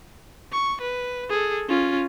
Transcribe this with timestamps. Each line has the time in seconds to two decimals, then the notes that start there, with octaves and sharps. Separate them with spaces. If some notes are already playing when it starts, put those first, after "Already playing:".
0.52 C#6
0.81 B4
1.30 G#4 A4
1.68 C#4 F4